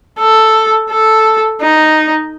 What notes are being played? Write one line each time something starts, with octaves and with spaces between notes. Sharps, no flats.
A4
A4
D#4